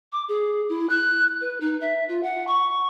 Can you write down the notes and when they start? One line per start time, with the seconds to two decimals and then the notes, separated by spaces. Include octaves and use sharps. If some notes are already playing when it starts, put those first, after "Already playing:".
0.12 D6
0.28 G#4
0.69 E4
0.89 F#6
1.41 B4
1.60 D#4
1.80 E5
2.08 F4
2.23 F#5
2.47 C#6